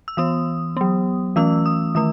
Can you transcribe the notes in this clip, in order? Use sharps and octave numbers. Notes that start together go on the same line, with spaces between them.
E6
E3 B3 D#6
F#3 B3
E3 A3 C#4 E6
D#6
D#3 A3 D#6